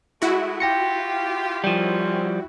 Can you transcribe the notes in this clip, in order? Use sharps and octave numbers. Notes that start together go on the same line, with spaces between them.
G#3 A3 E4 F#4
F4 G4 G5 A#6 C#7
D#3 F3 G3 C4 C#4